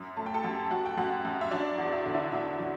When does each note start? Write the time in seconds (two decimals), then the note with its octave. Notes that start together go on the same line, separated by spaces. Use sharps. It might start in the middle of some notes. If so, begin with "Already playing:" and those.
Already playing: F#2
0.17 A3 A5
0.26 G5
0.34 A4 A5
0.43 F#2 G4 G5
0.71 F#2 F#4 F#5
0.86 G5
0.97 F#2 F#4 F#5
1.25 F#2
1.41 E5
1.51 F#3 D4 D5
1.78 E2
1.93 E5
2.03 D3 D5
2.14 E4 E5
2.32 D3 E4 E5
2.59 F#3